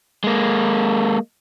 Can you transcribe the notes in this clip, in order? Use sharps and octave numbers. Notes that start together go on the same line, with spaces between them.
G#3 A#3